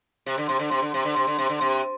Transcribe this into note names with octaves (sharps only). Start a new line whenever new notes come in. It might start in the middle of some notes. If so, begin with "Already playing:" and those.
C3
D3
C3
D3
C3
D3
C3
D3
C3
D3
C3
D3
C3